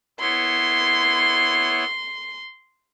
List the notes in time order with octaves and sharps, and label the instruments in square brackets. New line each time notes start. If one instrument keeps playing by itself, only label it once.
[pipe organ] B3 E4 C#5 [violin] C6